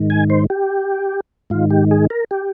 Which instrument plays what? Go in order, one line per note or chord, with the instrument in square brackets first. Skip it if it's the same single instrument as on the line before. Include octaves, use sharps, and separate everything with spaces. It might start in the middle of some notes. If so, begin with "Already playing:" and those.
Already playing: [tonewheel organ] G#2 D#3
G#5
C5
G4
G#2 D#3 F4
G4
G#4
A#4
G4